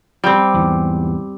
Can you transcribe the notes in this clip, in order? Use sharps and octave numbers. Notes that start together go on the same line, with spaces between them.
G3 C4
E2 G#2 E3